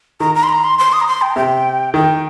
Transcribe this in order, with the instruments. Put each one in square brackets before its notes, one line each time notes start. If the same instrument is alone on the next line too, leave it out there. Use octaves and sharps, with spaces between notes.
[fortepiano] D#3 [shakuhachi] A#5
[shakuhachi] A#5
C6
A#5
C6
C6
D#6
A#5
C6
G5
A#5
[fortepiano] C3 [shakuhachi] G5
[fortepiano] D#3 [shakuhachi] G5